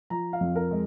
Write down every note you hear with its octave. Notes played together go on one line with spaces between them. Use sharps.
F3 A#5
F5
F2
A#4
G#3